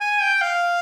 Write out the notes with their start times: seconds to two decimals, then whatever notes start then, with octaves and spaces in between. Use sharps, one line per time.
0.01 G#5
0.22 G5
0.42 F5